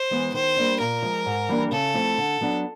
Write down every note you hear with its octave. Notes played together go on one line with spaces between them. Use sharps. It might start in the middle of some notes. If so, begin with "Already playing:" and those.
Already playing: C5
E3 G#3 B3
D#3 C5
G3 A#3 D4
A#2 A#4
F3 G#3
G#2
E3 G3 A#3 D4
C#3 A4
F3 A3 C4 E4
D3
F#3 B3 D4